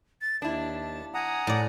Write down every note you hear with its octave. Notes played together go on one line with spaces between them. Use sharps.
A6
D#2 D4 E4 A5
F#5 G#5 A#5 D#6
A2 D5